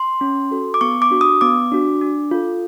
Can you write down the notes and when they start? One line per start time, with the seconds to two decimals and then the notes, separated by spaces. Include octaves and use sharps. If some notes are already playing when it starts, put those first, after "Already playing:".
Already playing: C6
0.21 C#4
0.51 F#4 A4
0.74 D6
0.81 B3 C#6
1.02 D6
1.11 D4 F#4
1.21 D#6
1.41 B3 D6
1.72 D4 F#4
2.01 D4
2.31 F4 A4